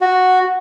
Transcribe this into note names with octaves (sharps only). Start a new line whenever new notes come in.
F#4